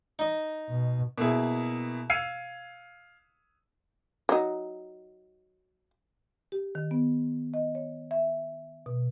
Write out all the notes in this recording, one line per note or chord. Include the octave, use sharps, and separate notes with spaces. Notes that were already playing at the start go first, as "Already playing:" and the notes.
D#4 D#5
B2
B2 A#3 E4 G#4
F5 E6 G#6 C7 C#7 D#7
F#3 D#4
G4
D#3
B3
D#5
C#5
E5
B2